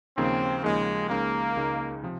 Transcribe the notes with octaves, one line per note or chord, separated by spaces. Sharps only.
D#2 C#3 F3 A#3 C4 D#4
D#2 C#3 F3 G#3 A#3 D#4
C#2 C#3 G#3 A#3 D#4
C#2 C#3 G#3 D#4
C3 F3